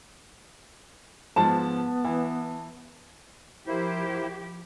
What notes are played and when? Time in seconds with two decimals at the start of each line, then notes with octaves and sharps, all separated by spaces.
1.36 G#2 F3 B3 A5
2.04 E3
3.67 F3 A#3 E4 G4 C5